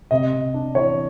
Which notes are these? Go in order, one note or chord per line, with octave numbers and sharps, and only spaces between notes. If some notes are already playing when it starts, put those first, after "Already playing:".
C3 D#5
C3
D4
E3 C#5